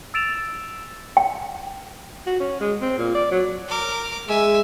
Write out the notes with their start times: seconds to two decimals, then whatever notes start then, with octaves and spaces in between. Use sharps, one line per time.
0.14 E6 A6 D7 E7 F7
1.17 G5
2.27 F#4
2.40 C#4
2.60 G#3
2.81 C4
2.98 A#2
3.15 D5
3.31 F#3
3.68 A#4 D6
4.28 G#3 E5 G#5